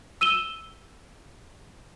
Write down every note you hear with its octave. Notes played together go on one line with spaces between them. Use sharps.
E6 D#7 E7 G7